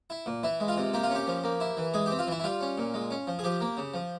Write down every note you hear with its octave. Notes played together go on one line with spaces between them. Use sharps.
E4
A#2
E3 E4
G#3
F4
C3
A#3 G4
F4
C#4 G4
F3
A#3
E4
E3
G#3 G#4
C4 G4
F4
E3 E4
E4
G3 F4
C#4
A#2
G#3
C#4
F3
G#4
F3 G4
A#3
C#3
F3